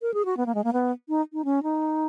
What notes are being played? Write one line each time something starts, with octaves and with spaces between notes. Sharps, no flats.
A#4
G#4
F#4
B3
A#3
G#3
A#3
B3
D#4
D#4
C#4
D#4